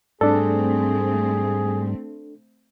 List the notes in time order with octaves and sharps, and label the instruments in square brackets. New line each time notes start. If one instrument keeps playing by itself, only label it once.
[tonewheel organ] G#2 G3 [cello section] A3 C4 [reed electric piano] D4 A4 [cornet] G#4